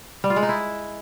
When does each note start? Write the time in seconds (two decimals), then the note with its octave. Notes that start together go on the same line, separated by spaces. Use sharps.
0.24 G3
0.30 F4
0.36 G#3
0.43 D#4
0.49 E4